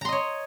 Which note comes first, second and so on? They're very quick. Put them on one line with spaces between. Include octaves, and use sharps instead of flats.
A#5 C6 D#5 C#5